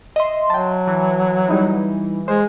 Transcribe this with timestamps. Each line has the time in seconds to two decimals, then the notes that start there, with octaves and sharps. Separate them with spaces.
0.16 D#5 E5 C6
0.50 F#3 G5 A5
0.87 E3
1.49 G3 D#4 E4
2.28 G#3 C5